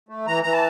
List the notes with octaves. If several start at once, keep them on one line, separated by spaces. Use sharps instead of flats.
A3
E3 A#5
E3 A#5
A5